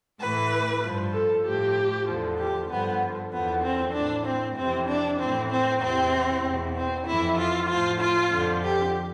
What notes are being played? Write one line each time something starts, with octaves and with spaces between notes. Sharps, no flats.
A2 E3 B4
G2 F3
A4
A2 F3 G4
E2 D3 F3
G4
G2 D3 F3 B3
E2 D3 F3 B3
C4
A2 E3 D4
C4
F2 C3 E3 C4
D4
A2 E3 C4
C4
E2 C3 E3 C4
E2 B2
C4
F2 E3 E4
F4
A2 F3 F4
F4
F2 D3 F3
G4